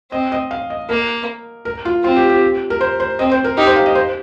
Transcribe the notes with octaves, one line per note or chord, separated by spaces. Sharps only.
C4 D#5
D#5
F5
D#5
A#3 A#4
A#4
F4
C4 F4
G4
G4
A#4
C5
C5
C4 D#5
C5
A#4
D#4 G4
C5
F5
D#5
C5